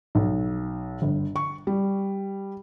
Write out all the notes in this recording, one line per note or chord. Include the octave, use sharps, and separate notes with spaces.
B1
G1
C#6
G3